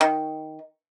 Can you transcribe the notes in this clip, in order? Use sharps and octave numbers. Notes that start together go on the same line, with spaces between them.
D#3